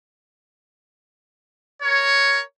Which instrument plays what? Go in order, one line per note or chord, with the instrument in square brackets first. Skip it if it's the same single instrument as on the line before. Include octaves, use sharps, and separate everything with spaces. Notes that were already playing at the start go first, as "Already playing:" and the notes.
[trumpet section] A#4 C#5